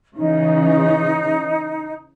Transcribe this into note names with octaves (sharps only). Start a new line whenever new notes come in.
C#3 E3 D#4